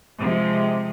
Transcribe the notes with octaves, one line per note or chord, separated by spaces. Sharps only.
C3 F3 G#3